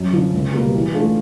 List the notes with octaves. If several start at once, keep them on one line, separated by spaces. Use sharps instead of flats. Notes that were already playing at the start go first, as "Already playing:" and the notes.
Already playing: F#2
D3 F3
C#2
B2 G3 A#3
E3
A3 D4 F4 A4